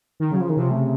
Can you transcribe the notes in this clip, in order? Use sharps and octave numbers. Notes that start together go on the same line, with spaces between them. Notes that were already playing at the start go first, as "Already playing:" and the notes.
D#3
C#3 F#3
F3
D#3
C3 F3
A3